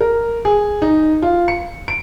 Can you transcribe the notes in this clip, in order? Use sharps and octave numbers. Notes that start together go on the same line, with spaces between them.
A#4
G#4
D#4
F4
C#7
D7